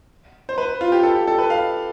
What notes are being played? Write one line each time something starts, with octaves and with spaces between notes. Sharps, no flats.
C5
B4
F4
G4
A4
G4
A4
B4
F5